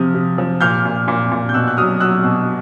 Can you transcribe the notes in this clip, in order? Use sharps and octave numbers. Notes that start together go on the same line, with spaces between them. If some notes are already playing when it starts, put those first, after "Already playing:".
Already playing: C3 F3 D#6 F6
C3
F3
A#2 F6 G6
A#2
A#2
A#2
G6
B2 E6 F#6
F#6
F#3 D#6 F6
F#3 E6 F#6
B2